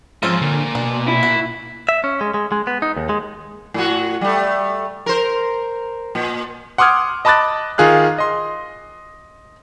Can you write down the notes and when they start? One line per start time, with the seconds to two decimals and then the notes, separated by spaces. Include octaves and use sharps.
0.23 G#2 F3 C4 C#4 F4
0.42 A#2 D3
0.75 B2 D4
1.08 E4
1.23 F#4
1.89 E5
2.04 C#4
2.21 G#3
2.34 G#3
2.52 G#3
2.67 B3
2.82 D#4
2.97 D#2
3.09 G#3
3.74 A2 F#4
4.21 G3 A3
5.06 A#4 C5
6.15 A#2
6.78 F#5 C6 D6 D#6 F6 G#6
7.25 D#5 A5 B5 D6 F#6 A6
7.78 D#3 F4 G#4 F5 F#6
8.18 D#5 C6